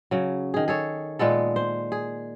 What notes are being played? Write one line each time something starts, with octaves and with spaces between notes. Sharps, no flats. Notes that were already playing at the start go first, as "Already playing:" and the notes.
C#3 F#3
D#3 G#4
G#4 A4 C#5
A#2 G#3 B3 A4
C5
G#4